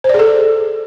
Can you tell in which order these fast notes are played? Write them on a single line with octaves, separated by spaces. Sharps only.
C5 D5 G#4 A4